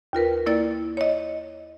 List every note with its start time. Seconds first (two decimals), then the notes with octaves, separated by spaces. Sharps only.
0.13 D#2 F4 A#4 B4
0.46 A#3 E4 D5 A6
0.97 C#5 D#5